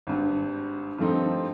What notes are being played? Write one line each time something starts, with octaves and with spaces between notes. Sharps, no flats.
G#1 G2
G2 D#3 F3 A3 C4 D#4